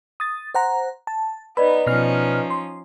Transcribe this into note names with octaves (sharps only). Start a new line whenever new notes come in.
D#6 A6
C5 F#5 A#5
A5
B3 D#4 B4 D5 D#5 B5
B2 F3 C#4 D#4 F6
C6